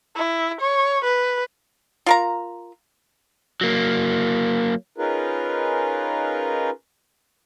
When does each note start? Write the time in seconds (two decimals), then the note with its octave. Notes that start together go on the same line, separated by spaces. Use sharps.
0.16 E4
0.61 C#5
1.04 B4
2.06 F4 A#4 A#5
3.61 F#3 A#3
4.98 C#4 D#4 F4 G#4 A#4 B4